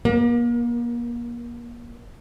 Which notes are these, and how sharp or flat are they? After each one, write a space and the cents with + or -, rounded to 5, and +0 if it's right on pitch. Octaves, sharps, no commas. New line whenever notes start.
A#3 +35